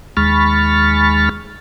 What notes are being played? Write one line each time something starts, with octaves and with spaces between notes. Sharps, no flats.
D#2 G#3 B5 C#6 F6 A6